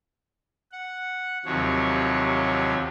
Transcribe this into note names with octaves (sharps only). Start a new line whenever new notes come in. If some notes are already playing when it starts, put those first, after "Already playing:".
F#5
D#2 C3 F3 F#3 C#5